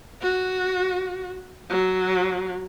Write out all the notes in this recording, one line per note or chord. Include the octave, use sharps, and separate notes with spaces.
F#4
F#3